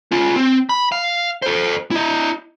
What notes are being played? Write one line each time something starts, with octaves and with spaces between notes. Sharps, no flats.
C#4 F4
C4
B5
F5
A4 C5
E4 D#5